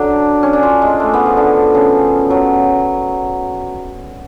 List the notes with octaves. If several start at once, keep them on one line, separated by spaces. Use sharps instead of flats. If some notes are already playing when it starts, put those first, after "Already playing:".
Already playing: D3 F#3 D4
C#4
D4
F4
G#3
A3
B3
F3
D3
C#3
F#3